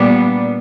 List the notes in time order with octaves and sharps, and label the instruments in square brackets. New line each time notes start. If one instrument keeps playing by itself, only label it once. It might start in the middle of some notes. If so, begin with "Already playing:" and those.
Already playing: [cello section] A#2 G3 B3 D4